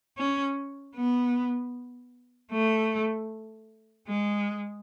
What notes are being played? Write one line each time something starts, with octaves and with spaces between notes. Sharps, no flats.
C#4
B3
A3
G#3